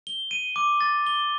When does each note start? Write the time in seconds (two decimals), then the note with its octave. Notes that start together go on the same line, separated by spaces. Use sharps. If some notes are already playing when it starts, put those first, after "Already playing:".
0.07 G7
0.31 D#7
0.56 D6
0.81 A6
1.07 G7